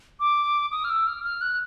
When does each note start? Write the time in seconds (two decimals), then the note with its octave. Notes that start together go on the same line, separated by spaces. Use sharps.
0.20 D6
0.72 D#6
0.84 F6
0.90 E6
1.07 F6
1.24 F6
1.41 F#6